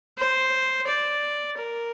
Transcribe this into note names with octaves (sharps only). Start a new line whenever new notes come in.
C5
D5
A#4